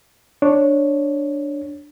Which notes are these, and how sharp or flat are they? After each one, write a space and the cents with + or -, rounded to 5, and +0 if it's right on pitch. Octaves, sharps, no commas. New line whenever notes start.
D4 +0 C#5 -5